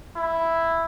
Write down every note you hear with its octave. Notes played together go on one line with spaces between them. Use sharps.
E4